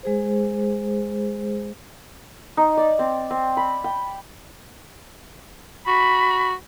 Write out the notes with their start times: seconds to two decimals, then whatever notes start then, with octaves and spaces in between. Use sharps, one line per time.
0.03 G#3 G#4 C5
2.57 D#4
2.77 D5
2.99 C4
3.31 C4
3.57 B5
3.84 G5
5.87 F#4 B5